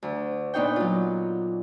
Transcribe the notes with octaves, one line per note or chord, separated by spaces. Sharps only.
D2
A#2 B3 D4 D#4 C#5 G5
F#3 F4